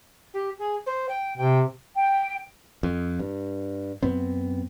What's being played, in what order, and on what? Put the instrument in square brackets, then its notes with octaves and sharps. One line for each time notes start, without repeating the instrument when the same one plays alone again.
[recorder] G4
G#4
C5
G5
[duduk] C3 [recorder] G5
[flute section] G5
[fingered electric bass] F2
G2
F#2 B3 C4